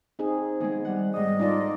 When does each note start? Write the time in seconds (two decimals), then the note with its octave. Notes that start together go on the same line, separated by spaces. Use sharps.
0.19 C4 D#4 G#4
0.60 D#3 G#3 B3 G#4
0.85 G3 F#5
1.14 G#2 G3 D#5 D#6
1.39 D4 D#4 F4 A4 D5